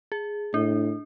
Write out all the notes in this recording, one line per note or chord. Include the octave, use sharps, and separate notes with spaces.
G#4
A2 D4